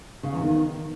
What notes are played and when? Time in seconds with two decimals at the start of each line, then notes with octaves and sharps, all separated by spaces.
0.23 C#3
0.33 E2
0.42 D#3